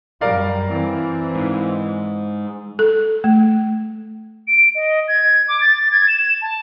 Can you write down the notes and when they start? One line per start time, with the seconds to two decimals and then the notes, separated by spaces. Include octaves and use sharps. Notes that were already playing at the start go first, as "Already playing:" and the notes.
0.21 F#2 G3 A#4 D5 F5
0.69 E3 C4
1.35 G#2
2.79 A4
3.24 A3
4.48 D7
4.75 D#5
5.08 G#6
5.48 D6
5.61 A6
5.92 G#6
6.08 E7
6.42 A5